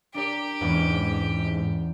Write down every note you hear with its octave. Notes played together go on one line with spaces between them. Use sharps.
D4 G4 A#4 D5
E2 G#2 B3 C#4